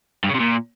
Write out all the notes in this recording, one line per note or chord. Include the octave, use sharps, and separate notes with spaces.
G2
C#3
C3
A#2